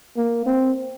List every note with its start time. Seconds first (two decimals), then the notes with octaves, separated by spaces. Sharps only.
0.17 A#3
0.46 C4